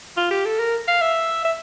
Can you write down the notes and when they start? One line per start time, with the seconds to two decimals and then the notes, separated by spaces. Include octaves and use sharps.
0.17 F4
0.31 G4
0.45 A4
0.60 A#4
0.88 F5
1.02 E5
1.45 E5